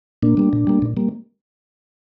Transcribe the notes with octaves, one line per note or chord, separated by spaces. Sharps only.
A#2 A#3 D4
G3 A#3
A#2
G3 A#3
A#2
G3 A#3